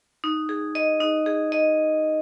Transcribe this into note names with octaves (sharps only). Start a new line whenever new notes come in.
D#4
G#4
D#5
D#4
G#4
D#5